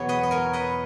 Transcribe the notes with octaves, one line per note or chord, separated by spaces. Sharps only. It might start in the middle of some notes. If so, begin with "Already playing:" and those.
Already playing: E2 B2 F#3 B3 C#5
B4 D#5
D#5
A#4 C#5
B4 D#5